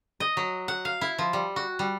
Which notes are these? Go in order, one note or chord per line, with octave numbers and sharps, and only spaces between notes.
D#5
F#3
F#5
F5
E4
F3
G3
F#4
G3